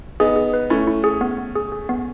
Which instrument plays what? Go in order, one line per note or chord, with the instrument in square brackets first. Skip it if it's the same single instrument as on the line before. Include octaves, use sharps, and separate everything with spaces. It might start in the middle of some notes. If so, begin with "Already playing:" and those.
[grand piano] B3 D#4 [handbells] G#4
[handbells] G#4
B4
[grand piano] A3 C#4 [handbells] E4
[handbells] E4
G#4
B3
B3
G#4
G#4
B3